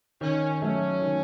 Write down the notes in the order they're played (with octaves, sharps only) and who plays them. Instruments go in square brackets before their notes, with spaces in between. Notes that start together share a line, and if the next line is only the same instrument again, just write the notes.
[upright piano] D#3 [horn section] C#4
[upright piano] F#3 A3 [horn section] C#4
[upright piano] D#3